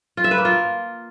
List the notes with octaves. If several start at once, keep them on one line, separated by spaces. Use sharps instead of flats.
F4
E5
B4
A#3
F4